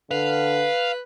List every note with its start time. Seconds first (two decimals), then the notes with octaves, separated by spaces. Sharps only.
0.11 D3 B4 F5